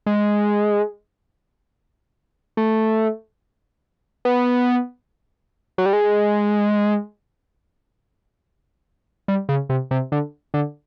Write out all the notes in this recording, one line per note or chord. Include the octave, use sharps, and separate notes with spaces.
G#3
A3
B3
F#3
G3
G#3
G3
C#3
C3
C3
D3
D3